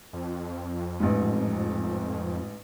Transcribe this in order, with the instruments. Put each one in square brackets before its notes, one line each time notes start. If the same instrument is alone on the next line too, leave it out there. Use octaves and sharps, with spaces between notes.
[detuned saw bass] F2
[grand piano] A1 G#2